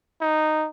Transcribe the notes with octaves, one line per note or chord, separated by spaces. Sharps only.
D#4